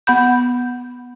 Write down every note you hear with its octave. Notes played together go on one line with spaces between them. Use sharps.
B3 F#5 B5 G6